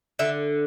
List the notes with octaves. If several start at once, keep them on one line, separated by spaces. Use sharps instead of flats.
D3 E5